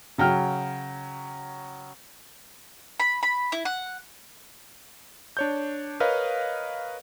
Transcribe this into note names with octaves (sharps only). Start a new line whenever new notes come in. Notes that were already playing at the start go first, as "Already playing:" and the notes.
C#3 F#3 G5 F6
B5
B5
E4
F#5
D4 C#5 G6
A#4 B4 C#5 D#5 F5